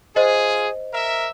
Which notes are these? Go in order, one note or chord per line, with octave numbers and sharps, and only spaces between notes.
F4 G#4 C5 D#5
A#4 E5